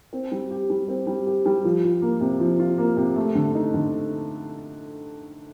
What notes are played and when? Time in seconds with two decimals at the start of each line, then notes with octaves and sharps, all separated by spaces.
0.13 C4
0.32 G3
0.51 G4
0.70 G3
0.88 C4
1.07 G3
1.27 G4
1.46 G3
1.65 F3
1.84 F4
2.02 A#3
2.21 C3
2.40 F3
2.59 F4
2.78 A#3
2.97 C3
3.16 A3
3.35 D3
3.55 D#4
3.74 D3